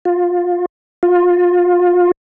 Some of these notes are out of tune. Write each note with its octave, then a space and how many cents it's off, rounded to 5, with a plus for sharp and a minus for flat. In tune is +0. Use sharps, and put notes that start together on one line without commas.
F4 +20
F4 +25